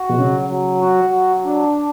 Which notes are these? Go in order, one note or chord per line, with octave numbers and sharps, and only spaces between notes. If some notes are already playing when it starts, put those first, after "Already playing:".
Already playing: F#4
B2
C#3 F#3
F#3
F#4
F#3
D4